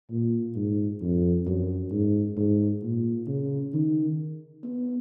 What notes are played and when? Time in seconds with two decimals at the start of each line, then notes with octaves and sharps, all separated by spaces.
0.11 A#2
0.55 G#2
1.01 F2
1.46 F#2
1.91 G#2
2.37 G#2
2.82 A#2
3.27 C#3
3.73 D#3
4.63 B3